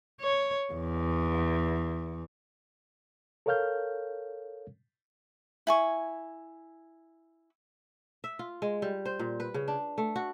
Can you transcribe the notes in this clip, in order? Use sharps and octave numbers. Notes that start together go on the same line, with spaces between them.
C#5
E2
A4 A#4 C#5 F5 F6 G6
E4 G#5 C#6
E5
F4
G#3
G3
C5
A#2
B4
C#3
D4
A3
F#4